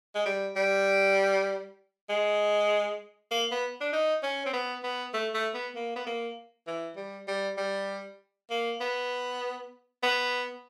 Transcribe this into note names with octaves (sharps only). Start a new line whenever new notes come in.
G#3
G3
G3
G#3
A#3
B3
D4
D#4
C#4
C4
B3
B3
A3
A3
B3
A#3
B3
A#3
E3
G3
G3
G3
A#3
B3
B3